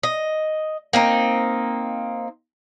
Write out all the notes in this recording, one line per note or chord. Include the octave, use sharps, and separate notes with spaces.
D#5
A#3 C4 D#4